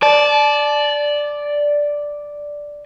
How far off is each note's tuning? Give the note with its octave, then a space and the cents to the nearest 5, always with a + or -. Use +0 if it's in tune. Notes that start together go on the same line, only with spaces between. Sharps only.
D5 +0 A5 -25